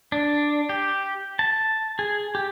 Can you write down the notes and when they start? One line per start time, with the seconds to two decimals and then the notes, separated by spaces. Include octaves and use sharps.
0.12 D4
0.69 G4
1.39 A5
1.99 G#4
2.35 G4